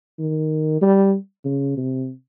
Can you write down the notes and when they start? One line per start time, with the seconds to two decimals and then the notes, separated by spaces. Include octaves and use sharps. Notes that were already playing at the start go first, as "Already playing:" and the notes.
0.19 D#3
0.82 G3
1.45 C#3
1.77 C3